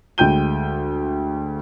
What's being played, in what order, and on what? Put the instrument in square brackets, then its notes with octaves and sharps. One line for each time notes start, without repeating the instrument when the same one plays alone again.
[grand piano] D2 G#3 G5 G6 D#7 G7